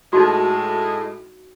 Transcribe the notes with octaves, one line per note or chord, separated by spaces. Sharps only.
A2 G#3 D#4 F#4